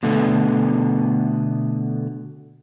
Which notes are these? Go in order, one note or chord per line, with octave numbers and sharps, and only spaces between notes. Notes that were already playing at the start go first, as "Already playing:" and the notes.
B2 D3 A3 B3